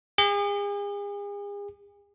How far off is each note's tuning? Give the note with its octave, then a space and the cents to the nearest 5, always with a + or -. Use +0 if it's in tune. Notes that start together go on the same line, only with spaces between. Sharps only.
G#4 -40